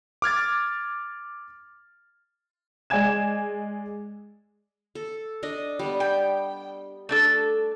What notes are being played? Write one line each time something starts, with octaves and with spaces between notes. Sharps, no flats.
D6 F6 G#6 A6
G#3 D5 G#5 G#6 E7
A4
D4 D#5
G3 B3
G5
A3 D4 A4